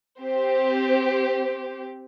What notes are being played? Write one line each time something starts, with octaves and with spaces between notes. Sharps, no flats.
C4 G4 C5